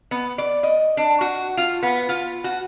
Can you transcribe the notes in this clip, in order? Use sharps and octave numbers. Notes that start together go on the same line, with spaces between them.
B3
D5
D#5
D4
F#4
F4
B3
F4
F#4